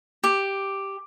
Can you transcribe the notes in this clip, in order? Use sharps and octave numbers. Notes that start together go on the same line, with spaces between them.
G4